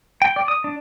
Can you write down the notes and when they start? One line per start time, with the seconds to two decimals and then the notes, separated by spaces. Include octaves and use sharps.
0.22 G5
0.36 D5
0.48 D#6
0.64 D4